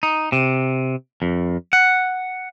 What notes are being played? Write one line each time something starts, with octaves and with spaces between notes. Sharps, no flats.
D#4
C3
F2
F#5